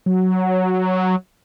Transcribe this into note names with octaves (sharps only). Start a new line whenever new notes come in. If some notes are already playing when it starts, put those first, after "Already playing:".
F#3